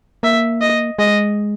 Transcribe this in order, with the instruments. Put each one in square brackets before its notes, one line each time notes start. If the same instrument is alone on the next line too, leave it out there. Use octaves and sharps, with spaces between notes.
[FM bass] A#3 [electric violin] E5
[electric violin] D#5
[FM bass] G#3 [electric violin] D#5